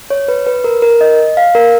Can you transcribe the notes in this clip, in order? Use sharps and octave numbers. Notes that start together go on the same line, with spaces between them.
C#5
B4
B4
A#4
A#4
D#5
F5
A#4